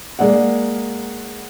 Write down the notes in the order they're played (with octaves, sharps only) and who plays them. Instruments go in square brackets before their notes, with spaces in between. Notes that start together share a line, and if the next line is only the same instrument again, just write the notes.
[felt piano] G#3 A#3 D5 F#5